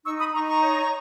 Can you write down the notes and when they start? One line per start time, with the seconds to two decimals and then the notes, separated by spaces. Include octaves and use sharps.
0.04 D#4 C#6 E6
0.19 B5 D#6
0.33 D#4 A#5 C#6
0.48 A#5 C#6
0.62 C#5